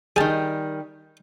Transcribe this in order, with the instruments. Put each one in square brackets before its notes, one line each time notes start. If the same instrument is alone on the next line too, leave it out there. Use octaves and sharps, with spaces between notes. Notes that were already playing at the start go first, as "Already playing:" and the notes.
[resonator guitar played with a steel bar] D#3 G3 [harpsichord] G#4 A5